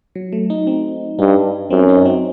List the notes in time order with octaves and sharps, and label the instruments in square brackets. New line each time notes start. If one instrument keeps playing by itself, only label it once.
[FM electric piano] F#3
A3
D#4
C4
[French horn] G2 [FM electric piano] D#4
[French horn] F#2 [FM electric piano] C4
[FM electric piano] D#4
C4